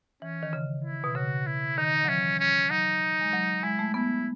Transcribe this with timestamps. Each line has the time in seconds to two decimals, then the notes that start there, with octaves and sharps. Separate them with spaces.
0.22 E3 C#4
0.43 D#3
0.53 C#3
0.85 E4
1.04 B2
1.15 C#3 F#4
1.46 E4
1.78 D#3 D#4
2.05 F#3
2.08 E3 C#4
2.40 C#4
2.70 F#3 D#4
3.21 G#3
3.33 F#3
3.63 G#3 E4
3.79 A3
3.94 B3 E4